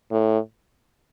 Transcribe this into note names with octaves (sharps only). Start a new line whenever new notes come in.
A2